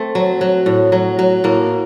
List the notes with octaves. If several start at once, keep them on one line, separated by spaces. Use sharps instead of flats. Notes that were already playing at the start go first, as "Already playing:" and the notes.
Already playing: A3 C4
F#3
F#3
A2
F#3
F#3
A2 A#3